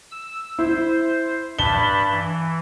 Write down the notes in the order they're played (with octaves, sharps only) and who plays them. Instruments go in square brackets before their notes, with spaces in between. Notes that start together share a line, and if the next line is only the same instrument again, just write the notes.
[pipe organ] E6
[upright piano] E4 [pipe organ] C5
[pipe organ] G2 A5 B5 [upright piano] G7
[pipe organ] E3